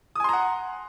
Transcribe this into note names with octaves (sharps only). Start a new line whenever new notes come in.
F#5 G#5 A#5 C6 D#6